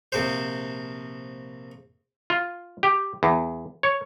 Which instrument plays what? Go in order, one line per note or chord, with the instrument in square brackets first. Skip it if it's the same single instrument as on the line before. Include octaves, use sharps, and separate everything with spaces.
[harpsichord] A#1 C3 C5
[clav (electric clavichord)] F4
G4
E2
C#5